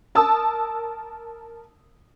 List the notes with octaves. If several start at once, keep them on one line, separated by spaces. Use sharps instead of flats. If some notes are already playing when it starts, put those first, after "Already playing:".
A#4 A5 D#6 E6